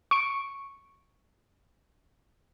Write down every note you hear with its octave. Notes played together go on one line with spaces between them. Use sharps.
C#6 D7